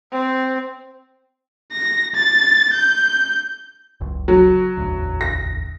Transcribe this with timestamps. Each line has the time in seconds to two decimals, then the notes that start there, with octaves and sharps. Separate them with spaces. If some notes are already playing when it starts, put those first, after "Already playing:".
0.12 C4
1.73 A#6
2.15 A6
2.73 G6
4.01 F#1 C#2
4.28 F#3
4.77 E1 A1 D2
5.21 A#6